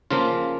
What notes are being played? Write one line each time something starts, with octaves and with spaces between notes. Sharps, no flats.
C#3 F3 A#3 F4